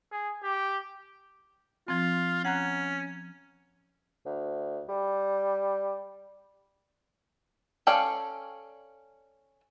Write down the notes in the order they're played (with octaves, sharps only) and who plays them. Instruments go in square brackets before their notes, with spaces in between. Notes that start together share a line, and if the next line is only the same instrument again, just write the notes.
[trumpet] G#4
G4
[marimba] F3 C4 [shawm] F4
[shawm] C#4 [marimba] F#5 A#5 F#6
[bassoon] D2
G3
[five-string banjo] C#4 A4 D5 F5 G5